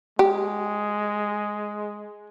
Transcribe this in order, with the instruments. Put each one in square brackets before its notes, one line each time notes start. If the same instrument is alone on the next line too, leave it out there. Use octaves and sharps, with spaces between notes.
[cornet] G#3 [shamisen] G4